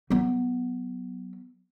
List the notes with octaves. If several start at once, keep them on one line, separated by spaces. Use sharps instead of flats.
F#3 B3